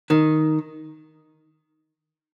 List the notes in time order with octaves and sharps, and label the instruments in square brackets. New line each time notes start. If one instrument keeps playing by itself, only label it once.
[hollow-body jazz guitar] D#3